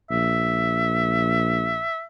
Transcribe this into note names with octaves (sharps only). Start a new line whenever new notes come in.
A#1 E5